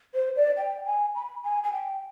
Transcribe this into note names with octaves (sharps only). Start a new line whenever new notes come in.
C5
D5
G5
G#5
B5
G#5
G#5
G5